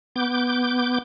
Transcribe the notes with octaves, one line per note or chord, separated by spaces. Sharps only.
B3 D6 G6